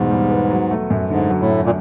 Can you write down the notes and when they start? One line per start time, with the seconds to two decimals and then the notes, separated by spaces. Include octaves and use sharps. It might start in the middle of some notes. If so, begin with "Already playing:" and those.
Already playing: E2 G#2 B2 G3 B3
0.11 G3
0.30 B3
0.50 F#3
0.71 A3
0.90 F#2
1.10 G#2 D3
1.30 F#3
1.40 A2
1.50 A3
1.65 A#2